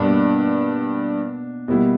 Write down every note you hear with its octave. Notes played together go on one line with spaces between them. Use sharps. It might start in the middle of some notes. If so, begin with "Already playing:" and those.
Already playing: G2 B2 A#3 D4
B2 G3 A#3 E4